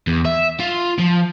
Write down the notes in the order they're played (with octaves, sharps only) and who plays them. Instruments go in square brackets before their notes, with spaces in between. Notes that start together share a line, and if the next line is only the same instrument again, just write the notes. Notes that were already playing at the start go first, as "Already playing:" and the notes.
[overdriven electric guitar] E2
E5
F4
F3